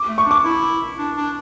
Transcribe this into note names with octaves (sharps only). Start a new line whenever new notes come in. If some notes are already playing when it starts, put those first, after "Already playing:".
Already playing: D6
A3
C#6
D4 D6
E4
D4
D4